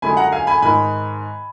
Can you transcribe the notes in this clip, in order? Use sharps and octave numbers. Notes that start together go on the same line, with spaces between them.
F#2 D3 G#3 G#5 B5
F#5 A#5
F5 G#5
G#5 B5
G#2 D#3 G#3 G#5 B5